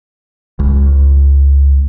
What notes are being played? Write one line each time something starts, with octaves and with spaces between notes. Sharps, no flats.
C#2